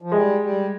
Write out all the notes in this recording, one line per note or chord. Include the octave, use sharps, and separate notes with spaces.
F3
G3 G#3
G3